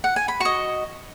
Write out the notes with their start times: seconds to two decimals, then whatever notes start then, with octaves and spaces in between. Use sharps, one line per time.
0.04 F#5
0.16 G#5
0.28 B5
0.40 F#4 D#5 C#6